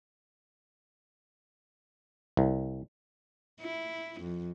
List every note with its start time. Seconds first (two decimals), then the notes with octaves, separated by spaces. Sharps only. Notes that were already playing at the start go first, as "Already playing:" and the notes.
2.37 C2
3.61 E4
4.21 F2